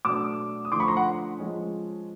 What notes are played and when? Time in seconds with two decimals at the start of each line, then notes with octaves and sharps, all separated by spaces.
0.05 B2 F#3 A3 D4 D6 E6
0.65 D#6
0.72 D3 F3 A3 C6 D6
0.80 B5 C#6
0.88 A#5 C6
0.97 F#5
1.38 F3 G#3 C#4